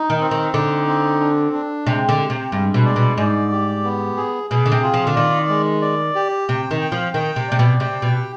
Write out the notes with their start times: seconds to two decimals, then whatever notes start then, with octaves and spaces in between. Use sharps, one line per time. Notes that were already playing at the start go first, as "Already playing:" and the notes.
Already playing: D#4
0.10 D#3
0.21 C4
0.31 D#3
0.54 D3 D#4
0.87 C4
1.20 D4
1.53 D4
1.86 C3 G#3
2.09 D3
2.19 G4
2.30 C3
2.52 G2 G#3
2.74 B2
2.85 D5
2.96 B2
3.17 G#2 D5
3.52 G4
3.84 B3
4.17 G#4
4.50 B2 G#4
4.66 D3
4.72 C3
4.83 F4
4.94 F3
5.07 D3
5.16 D#3 D5
5.49 G#3
5.82 D5
6.15 G4
6.48 C3 G5
6.71 D#3
6.81 G5
6.92 F3
7.14 D#3 G5
7.36 C3
7.48 C3 D5
7.59 B2
7.80 C3 G5
8.02 B2
8.14 G4